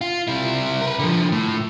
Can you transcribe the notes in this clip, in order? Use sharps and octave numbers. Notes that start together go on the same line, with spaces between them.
F4
C3 E4
A#4 B4
D3 F3
A2